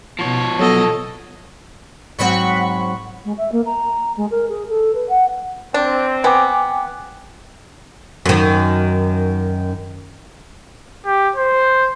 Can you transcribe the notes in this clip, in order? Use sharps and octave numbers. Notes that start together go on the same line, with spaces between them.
B2 F3 C#5
F#3 B3 A4 D#5
G#2 F#3 C4 F#5 B5 C#6
G#3
E5
A#3
A#5
G#3
A#4
G#4
A4
B4
F#5
C4 D4
B3 G5 G#5 D6
F#2 D#3
G4
C5